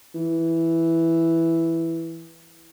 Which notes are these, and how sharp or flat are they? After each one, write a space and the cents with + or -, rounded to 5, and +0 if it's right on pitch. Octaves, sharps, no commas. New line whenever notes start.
E3 +0